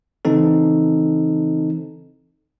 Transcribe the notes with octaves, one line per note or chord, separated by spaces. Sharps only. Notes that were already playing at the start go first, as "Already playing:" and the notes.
C#3 E3 C4 D#4 A4